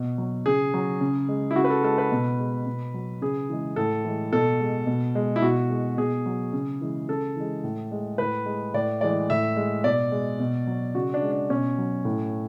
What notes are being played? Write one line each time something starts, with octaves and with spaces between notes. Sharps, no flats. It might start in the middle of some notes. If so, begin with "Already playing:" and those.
Already playing: B2
F#3
C#3 G#4
F#3
C#3
G#3
E4
C#3 F#4
B4
A4
G#3 A4
B4
B2
G#3
B2
F#3
C#3 G#4
E3 G#3
A2 A4
E3 G#3
B2 A4
G#3
B2
G#3
E4
B2 F#4
G#3
B2 G#4
F#3
C#3
E3 G#3
C#3 A4
E3 G#3
A2
G#3
A2 B4
G#3
A2 D5
E3 G#3 D5
A2 E5
G#3
B2 D5
G#3
B2
F#3
C#3 F#4
D4
G#3
D4
B2 C#4
F#3
A2